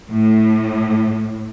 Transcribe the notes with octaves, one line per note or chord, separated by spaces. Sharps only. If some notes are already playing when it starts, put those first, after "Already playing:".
A2